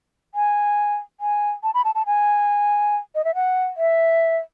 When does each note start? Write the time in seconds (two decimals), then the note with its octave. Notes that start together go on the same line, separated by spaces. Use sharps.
0.35 G#5
1.20 G#5
1.63 A5
1.74 B5
1.85 A5
1.95 A5
2.06 G#5
3.15 D#5
3.24 E5
3.35 F#5
3.77 E5